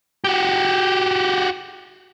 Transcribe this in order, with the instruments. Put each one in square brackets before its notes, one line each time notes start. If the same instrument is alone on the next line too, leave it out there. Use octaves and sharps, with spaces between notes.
[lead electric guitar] F#4 G4